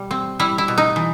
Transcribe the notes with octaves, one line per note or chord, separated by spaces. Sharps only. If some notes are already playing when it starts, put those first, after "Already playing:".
Already playing: B2 G3
C4
G3 E4
E4
B2
D#4
E3